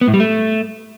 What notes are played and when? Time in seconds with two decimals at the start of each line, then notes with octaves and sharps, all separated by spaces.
0.01 B3
0.08 A2
0.14 G3
0.20 A3